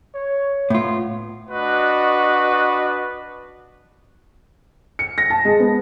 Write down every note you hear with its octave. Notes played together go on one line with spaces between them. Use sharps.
C#5
A2 B3 F4
D4 F#4 B4 D#5
C#7
A#6
A5
G#3
B3